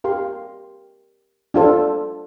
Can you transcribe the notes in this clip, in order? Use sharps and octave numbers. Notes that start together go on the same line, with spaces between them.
G4 A#4 F5 C6
D4 F4 A4 C5